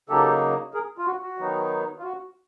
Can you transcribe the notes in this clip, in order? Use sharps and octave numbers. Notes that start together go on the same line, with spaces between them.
C#3 F#3 A#3 D#4 G4 A4
G#4 A#4
F4
F#4
F#4
D#3 F#3 B3 D#4
F4
F#4